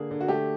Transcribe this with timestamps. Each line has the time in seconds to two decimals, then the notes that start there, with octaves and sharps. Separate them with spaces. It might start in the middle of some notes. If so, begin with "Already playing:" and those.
Already playing: D3 A#3 G#4
0.11 D3
0.21 F#4
0.28 A3 G4